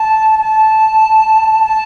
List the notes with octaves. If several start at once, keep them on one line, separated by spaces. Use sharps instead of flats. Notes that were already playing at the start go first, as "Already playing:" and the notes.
Already playing: A5
A5
A5